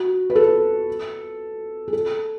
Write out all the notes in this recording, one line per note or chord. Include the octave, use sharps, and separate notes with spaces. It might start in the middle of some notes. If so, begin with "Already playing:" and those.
Already playing: F#4
B4
A4
G#4
A4